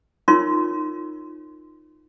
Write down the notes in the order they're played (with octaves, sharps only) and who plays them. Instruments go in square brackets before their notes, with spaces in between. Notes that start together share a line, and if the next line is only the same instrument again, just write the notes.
[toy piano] D#4 F4 A#4 C#5 C6